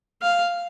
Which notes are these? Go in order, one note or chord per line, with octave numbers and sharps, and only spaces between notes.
F5